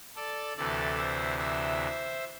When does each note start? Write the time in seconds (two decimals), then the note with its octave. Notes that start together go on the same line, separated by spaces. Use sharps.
0.16 A4 D5
0.57 D2 C3 E3 A4 D5
0.98 C5 E5
1.39 C5 E5